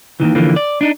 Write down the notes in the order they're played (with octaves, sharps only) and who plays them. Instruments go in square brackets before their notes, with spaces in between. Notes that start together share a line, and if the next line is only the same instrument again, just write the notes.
[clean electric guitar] D#2 A2 D#3 E3
D3 E3 F3 A#3
D5
D4 D#4